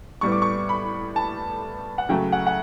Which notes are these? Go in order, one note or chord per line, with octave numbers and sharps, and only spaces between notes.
A2 G3 B3 C#6
D6
C#6
B5
A5
F#5
C#3 F#3 A3 G5
F#5
F#5